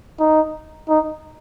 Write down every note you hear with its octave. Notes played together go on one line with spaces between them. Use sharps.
D#4
D#4